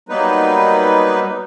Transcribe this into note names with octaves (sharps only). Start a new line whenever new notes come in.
F#3 G3 A#3 B3 D#4 B4